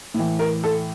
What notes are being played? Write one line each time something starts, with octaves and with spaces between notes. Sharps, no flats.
A2 E3
A#4
A4